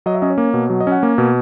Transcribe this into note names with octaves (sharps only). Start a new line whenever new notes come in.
F#3 D#5
E5
C#4 D#5
C#5
A#3
B2
F#3
D#5
C#4 F#5
A#3
B2